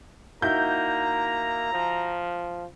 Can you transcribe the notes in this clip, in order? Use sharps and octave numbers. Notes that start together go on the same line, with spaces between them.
A#3 D#4 E4 F#4 A#5 G6
F3